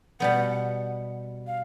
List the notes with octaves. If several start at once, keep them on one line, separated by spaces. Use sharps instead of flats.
B2 G3 B3 F#5
F5